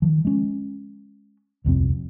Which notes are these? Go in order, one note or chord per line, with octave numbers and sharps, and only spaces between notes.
D#3 F3
G#3 C#4
D#1 C2 F2 C4